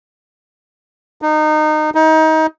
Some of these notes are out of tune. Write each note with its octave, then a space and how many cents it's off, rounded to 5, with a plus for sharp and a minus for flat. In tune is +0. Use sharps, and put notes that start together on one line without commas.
D#4 -25
D#4 +25